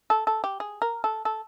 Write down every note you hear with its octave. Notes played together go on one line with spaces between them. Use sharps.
A4
A4
G4
G#4
A#4
A4
A4